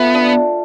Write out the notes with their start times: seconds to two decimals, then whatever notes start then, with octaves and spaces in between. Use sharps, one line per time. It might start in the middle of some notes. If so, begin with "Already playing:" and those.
Already playing: A3 B3 F4
0.14 D4